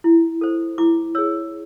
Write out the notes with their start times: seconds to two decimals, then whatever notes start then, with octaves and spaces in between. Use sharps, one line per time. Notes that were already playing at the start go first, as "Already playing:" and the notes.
0.04 E4
0.41 A4 C5
0.78 E4 D6
1.15 G#4 C#5 E6